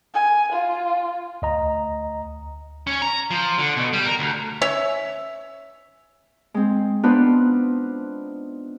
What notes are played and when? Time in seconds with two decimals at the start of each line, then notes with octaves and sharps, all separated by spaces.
0.14 G#5
0.52 F4
1.42 D2 D#5 A#5
2.87 C#4
3.02 A#5
3.31 F3
3.58 D3
3.77 B2
3.93 G3
4.06 A#4
4.19 D2
4.62 C#4 C#5 E5
6.54 G#3 C4
7.03 B3 D4 D#4 F4 B4 C5